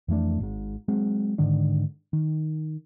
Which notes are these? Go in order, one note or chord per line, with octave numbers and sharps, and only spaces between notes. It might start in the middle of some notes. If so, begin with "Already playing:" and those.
F2 E3 A3 D4
G#1 G#2
F#3 G#3 C4
G#2 D3 D#3 D4
D#3